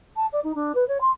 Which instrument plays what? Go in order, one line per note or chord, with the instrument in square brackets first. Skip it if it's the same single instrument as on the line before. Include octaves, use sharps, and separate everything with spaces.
[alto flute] A5
D5
D#4
D4
B4
C#5
C6